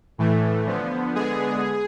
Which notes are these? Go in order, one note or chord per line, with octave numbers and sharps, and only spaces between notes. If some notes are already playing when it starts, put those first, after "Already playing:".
A2 E3 A3
D3 F3 B3
D3 G#3 B3 G#4